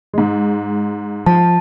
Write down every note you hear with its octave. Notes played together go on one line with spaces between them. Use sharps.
G#2 G#3
F3 A5